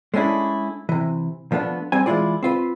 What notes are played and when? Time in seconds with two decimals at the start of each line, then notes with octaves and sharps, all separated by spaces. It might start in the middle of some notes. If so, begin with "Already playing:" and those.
0.14 G#3 A3 C#4 D4 E4
0.89 C3 E3
1.52 F3 A3 B3 D4
1.92 G3 C4 G#5
2.06 E3 G#3 C#4 E4 F4 D5
2.43 C4 F4 B4